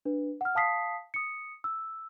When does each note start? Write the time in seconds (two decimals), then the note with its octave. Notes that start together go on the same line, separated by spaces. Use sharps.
0.05 D4 B4
0.41 F#5 F6
0.55 F5 A5 D#6 B6 C7
1.14 D#6 C#7
1.64 E6